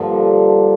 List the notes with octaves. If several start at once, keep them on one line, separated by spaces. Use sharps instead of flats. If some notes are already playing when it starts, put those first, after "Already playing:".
Already playing: G2 D3 F3 A#3 D4